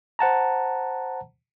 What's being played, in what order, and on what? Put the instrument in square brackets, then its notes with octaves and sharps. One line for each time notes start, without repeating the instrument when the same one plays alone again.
[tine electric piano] C5 F#5 A5 A#5